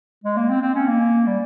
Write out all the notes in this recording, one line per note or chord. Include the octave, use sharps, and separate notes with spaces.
G#3
A#3
C4
C4
C#4
A#3
G3